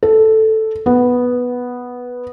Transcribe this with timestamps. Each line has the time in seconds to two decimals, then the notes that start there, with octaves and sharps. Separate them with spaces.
0.03 A4
0.86 B3